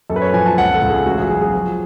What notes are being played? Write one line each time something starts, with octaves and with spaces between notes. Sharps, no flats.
F#2 A4
B4
C#5
F3 G#5
A5
C#2 F#5
A4
C#2
G#4
A1 F#4
G#4
F#3 G#4
G#4
F3